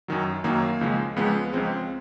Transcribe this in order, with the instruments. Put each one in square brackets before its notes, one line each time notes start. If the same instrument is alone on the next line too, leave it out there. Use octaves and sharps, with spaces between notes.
[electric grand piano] F#2 D#3 F#3
F#2 D#3 F#3 A#3
C#2 C#3 F3 G#3
C#2 C#3 F3 G#3 B3
C#2 C#3 F3 G#3 C4